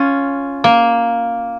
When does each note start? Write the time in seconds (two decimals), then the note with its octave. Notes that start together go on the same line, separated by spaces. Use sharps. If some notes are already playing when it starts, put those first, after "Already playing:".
Already playing: C#4 F4
0.64 A#3